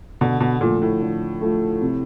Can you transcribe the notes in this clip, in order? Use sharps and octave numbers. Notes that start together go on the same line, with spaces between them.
B2 D3
B2
A#2 F3 A3
A2
D3
F3 A3
C3